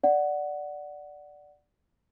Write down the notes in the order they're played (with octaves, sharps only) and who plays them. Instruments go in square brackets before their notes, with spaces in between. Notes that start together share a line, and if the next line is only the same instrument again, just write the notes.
[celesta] D5 F#5